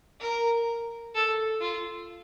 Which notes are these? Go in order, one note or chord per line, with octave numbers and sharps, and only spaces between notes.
A#4
A4
F4